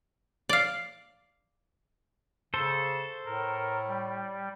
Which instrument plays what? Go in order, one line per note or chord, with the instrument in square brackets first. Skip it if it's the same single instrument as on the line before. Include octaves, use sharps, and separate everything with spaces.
[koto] D5 F5
[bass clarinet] C#3 [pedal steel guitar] A4 C5
[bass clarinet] A2 [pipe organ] A#4
[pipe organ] G3